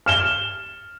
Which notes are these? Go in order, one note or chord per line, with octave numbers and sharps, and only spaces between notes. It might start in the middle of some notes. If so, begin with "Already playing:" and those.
F6 E7 G7